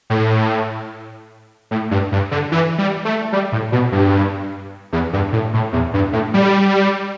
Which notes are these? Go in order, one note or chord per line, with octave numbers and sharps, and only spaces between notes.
A2
A2
G2
G2
D3
E3
G3
A3
G3
A2
B2
G2
E2
G2
A2
A2
E2
G2
A2
G3